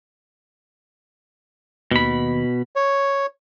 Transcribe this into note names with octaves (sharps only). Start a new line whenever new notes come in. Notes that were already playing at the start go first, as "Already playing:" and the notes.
D#2 B2 B5
C#5